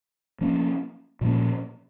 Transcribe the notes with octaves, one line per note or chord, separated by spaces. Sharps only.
F3 A#3 C#4
A#2 F3 A#3 C#4